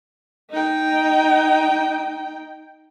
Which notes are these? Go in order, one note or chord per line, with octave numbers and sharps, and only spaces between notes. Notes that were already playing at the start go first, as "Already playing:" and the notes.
D#4 G5